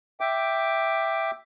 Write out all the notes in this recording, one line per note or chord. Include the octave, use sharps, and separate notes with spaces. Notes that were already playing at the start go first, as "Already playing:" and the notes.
E5 G5 D6